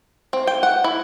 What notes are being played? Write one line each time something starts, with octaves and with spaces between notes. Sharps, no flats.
C4
G5
F#5
E4